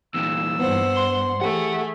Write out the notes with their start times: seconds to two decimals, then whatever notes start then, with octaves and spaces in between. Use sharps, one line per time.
0.14 E2 A#2 E6
0.60 G2 B3 C5 F#5
0.97 C6
1.41 E3 A3 G4 G#4 F#5